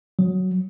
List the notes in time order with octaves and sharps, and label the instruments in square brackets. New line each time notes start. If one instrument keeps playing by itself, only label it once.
[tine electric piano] F#3